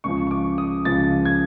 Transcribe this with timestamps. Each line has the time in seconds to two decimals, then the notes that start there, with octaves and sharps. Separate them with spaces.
0.04 C#2 C#3 F3 C#6
0.27 C#6
0.31 D6
0.58 D#6
0.85 C#2 C#3 F3 A6
1.25 G#6